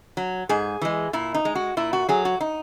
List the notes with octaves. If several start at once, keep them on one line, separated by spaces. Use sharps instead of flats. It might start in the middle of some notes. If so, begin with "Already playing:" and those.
F#3
G#2 G#4
E3 G#3
A#2 E4
D#4
G#3
F#4
A#2 E4
F#4
F#3 G#4
F#4
D#4